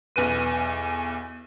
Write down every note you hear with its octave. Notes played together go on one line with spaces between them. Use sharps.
B1 E2 B4 D#7